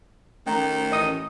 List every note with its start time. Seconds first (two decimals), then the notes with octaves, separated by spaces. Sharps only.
0.47 D#3 A3 C#4 A#5
0.92 A1 D#5 D#6